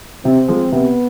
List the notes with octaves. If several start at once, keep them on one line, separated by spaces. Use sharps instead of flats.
C3 C4
F3 G#3
C3 B3